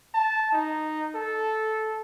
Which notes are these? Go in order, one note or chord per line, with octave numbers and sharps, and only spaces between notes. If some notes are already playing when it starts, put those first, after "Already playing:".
A5
D#4
A4